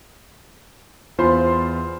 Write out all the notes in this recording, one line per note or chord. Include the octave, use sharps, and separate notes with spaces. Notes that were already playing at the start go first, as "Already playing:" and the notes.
E2 F4 C5 B5 C6